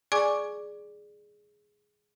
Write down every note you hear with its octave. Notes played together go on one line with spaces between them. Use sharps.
G#4 D5 G#5 C#6 D6